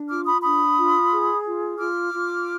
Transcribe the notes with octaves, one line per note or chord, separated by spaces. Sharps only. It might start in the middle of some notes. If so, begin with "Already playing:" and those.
Already playing: D4
F4 D6 F6
B5 D#6
D4 B5 D#6
F4
G#4
F4
F4 D6 F6
F4